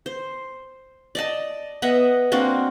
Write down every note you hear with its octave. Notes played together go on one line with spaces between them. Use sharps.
C5
D5 D#5 A5
B3 D#5 E5 F#5
A#3 C4 D4 F#4